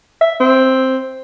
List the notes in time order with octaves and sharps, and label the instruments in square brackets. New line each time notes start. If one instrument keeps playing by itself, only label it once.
[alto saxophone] E5
C4